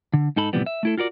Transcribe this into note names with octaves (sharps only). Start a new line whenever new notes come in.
D3
G#2 D#4 A4 B5
A2 C3 E3 F3 G3 B3
E5
A3 E4 A4
F4 F#4 A#4 D5